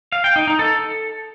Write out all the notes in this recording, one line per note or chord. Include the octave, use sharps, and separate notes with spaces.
F5
G5
D#4
D#4
A4